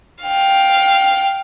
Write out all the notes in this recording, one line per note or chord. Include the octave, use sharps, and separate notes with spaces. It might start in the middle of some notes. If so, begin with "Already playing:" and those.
F5 G5